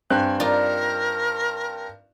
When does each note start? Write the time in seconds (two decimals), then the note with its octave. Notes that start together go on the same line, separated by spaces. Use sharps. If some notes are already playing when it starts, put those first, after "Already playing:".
0.10 G2 C4 G#5 F#6
0.40 D#4 F4 A#4 D5